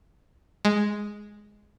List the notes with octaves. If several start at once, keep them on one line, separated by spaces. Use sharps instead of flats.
G#3